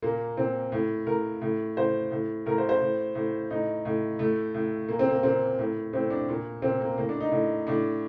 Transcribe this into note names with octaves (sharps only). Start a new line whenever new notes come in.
A#2 A#3
A#2 C4
A2
A2 A#4
A2
A2 C5
A2
A2 A#4
C5
C5
A2
A2
A2 D#4
A2
A2 A3
A2
A#2 A#3
C4
A#3
A#2 C4
A2
A2 C4
D4
A#2
A#2 C4
A#3
A2 A#3
D4
D#4
A2
A2 D4